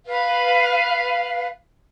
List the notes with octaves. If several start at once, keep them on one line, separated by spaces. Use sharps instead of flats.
B4 F5